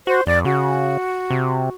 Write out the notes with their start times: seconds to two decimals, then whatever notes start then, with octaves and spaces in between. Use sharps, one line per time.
0.07 F#4 C5
0.27 F2 D5
0.45 C#3 F#4
1.30 C3